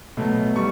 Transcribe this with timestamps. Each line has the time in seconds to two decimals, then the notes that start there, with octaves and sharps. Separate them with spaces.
0.17 B2 F#3 A3
0.56 G3 C#6